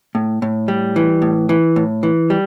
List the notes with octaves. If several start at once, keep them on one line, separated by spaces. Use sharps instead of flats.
A2
A2
G3
E3
A2
E3
A2
E3
G3